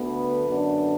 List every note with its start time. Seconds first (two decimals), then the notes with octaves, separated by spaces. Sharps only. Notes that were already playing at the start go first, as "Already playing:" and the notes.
Already playing: D2 D3 B3
0.15 B4
0.47 F#2 D3 B3 D4